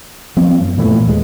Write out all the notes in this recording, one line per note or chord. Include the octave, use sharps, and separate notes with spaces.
F3 B3 C4
F#2
A#2 E3 A3
A#2
D#2 G#3